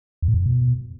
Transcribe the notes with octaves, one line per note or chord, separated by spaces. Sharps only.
E2
A2
F2
F#2
B2